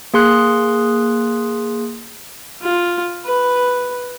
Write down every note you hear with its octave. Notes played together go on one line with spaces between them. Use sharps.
A#3 G#4 C6 F#6
F4
B4